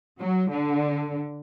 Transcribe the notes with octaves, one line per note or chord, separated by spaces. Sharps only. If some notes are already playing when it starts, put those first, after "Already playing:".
F#3
D3